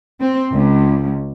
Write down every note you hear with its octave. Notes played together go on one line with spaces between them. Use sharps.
C4
C#2